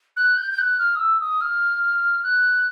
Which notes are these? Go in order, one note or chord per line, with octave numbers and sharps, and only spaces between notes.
F#6
G6
G6
F#6
F6
D#6
E6
D#6
F6
F#6